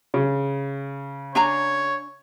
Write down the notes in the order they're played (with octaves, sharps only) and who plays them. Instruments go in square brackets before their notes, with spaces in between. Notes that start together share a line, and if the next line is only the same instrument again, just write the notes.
[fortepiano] C#3
[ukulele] D4 G#5 A#5 [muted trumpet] C#5